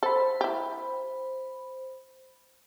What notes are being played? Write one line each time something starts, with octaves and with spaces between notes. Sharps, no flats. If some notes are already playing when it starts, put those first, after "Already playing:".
A4 C5 B5
E4 G4